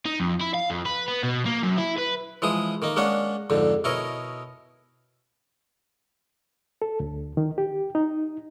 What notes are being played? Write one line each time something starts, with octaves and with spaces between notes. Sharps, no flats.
D#4
F2
E4
F5
F2
B4
B3
B2
A#3
F#2
E4
B4
E3 F3 G#3 G#4 D#6
D#3 A#3 D#4
G#3 A#3 C#4 D4 F#5 C#6
F2 G#2 D3
B2 E4 A#4 C#5 D#5
A4
D2
D#3
G4
D#4